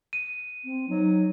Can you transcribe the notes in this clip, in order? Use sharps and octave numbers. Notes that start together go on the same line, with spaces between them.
D#7
C4
F#3 D#4